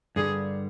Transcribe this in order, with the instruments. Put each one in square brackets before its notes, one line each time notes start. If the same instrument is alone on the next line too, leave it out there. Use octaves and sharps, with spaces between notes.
[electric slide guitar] G2 D3 G3 [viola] G#4